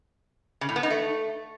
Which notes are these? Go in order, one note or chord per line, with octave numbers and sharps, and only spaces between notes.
C#3
A2
B3
D#4
A3